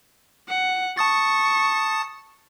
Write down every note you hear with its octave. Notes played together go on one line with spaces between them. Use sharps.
F#5
A5 C#6 D#6 A6